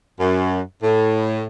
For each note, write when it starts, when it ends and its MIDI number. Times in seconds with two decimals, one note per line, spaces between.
0.20 0.61 42
0.83 1.45 45